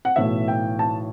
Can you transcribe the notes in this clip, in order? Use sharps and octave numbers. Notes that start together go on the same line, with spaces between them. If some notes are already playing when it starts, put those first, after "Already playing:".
F#5
B1 A2 E3 E5
G5
A5